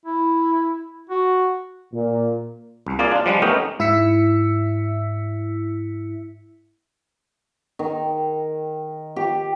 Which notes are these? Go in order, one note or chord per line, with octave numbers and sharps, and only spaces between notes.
E4
F#4
A#2
C2
A#3 F4 G#4 D5
D4 F4
F3 G3 G#3 D4
A3 B3 C#4 D#4 G4 A#4
G#2 E4 E5 E6 B6 C#7
D#3
G4